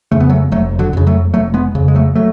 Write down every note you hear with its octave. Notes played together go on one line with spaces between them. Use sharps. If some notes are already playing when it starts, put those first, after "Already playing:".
F2 C#3 A3
B3
F#3 A3
F1 F#3 A3
D3 F#3
F2 C#3
F#3 A3
F1 F#3 A3
G#3 B3
F2 C#3
G#3
F#3 A3
F#3 A3